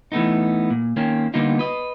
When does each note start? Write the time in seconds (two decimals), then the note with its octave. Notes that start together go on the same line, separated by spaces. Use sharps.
0.12 E3 A3 B3 D#4
0.70 A#2
0.97 D#3 A#3 C4 C#4
1.34 D3 G3 A#3 B3 D#4 F4
1.59 B4 D#5